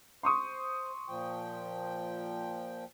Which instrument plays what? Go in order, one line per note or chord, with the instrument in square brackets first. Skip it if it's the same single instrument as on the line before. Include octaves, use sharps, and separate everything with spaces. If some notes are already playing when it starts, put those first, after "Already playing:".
[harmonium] C5 [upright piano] C6 C#6 D#6
[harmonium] A#2 F3 G5